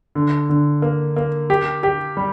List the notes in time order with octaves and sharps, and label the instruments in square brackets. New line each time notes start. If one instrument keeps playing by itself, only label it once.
[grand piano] D3
D3
A#3
A#3
G4
G4
G3